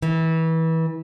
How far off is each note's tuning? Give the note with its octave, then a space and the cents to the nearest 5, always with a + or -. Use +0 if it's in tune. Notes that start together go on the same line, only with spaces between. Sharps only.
E3 -25